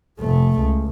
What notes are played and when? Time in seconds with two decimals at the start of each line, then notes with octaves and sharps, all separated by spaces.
0.19 F1 A3
0.60 C#2